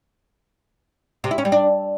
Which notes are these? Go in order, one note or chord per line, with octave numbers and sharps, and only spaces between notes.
C3
E4
C#4
G3
D4